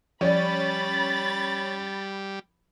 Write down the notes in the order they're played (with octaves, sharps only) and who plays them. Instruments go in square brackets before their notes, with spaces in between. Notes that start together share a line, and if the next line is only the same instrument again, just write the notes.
[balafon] F3 D5 [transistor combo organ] G3 [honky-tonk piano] C#4 [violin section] B5 A6